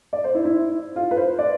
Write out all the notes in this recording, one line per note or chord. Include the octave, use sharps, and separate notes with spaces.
D5
C5
E4
E4
F4
B4
C5
D5